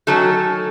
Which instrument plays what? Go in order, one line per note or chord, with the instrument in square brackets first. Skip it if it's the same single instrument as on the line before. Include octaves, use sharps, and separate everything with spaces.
[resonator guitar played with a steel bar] D#3 F#3 A3 C#4 A4